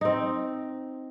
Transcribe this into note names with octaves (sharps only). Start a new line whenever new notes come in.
C4 D#4